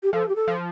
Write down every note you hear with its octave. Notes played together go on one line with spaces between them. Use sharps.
G4
F3 A4
G4
A4
F3